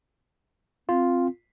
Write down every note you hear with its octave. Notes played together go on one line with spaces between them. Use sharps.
C4 F4